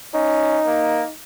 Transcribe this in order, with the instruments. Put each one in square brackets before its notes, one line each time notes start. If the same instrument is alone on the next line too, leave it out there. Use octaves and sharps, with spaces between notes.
[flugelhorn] C#4 [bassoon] D#4
[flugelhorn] A#3